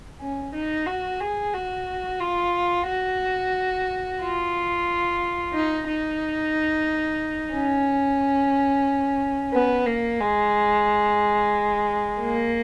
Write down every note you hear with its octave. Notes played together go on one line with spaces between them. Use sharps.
C#4
D#4
F#4
G#4
F#4
F4
F#4
F4
D#4
D#4
C#4
B3
A#3
G#3
A#3